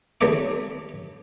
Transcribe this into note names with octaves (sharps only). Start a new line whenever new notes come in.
D#2 G#3 A3 C#5 D#5 D6